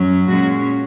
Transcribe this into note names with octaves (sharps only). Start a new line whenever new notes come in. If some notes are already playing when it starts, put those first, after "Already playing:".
Already playing: F#2 F#3 C#4
A#2 G#3 C#4 F#4